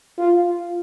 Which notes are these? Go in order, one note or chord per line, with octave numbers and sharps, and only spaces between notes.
F4